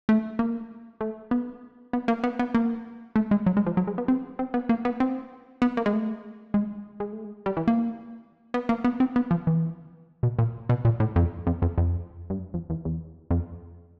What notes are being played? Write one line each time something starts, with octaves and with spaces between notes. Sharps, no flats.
A3
A#3
A3
B3
B3
A#3
B3
B3
A#3
A3
G#3
F#3
G#3
F3
F#3
G#3
B3
C4
C4
B3
A#3
B3
C4
B3
A#3
G#3
A3
G#3
G#3
A3
G#3
G3
E3
A#3
B3
A#3
B3
C4
B3
F3
E3
B2
A#2
B2
A#2
A2
F2
F2
F2
F2
G2
F#2
F2
E2
E2
F2